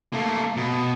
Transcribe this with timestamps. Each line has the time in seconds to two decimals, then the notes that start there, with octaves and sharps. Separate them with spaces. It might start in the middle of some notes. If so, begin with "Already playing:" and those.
0.13 A3 A#3
0.56 B2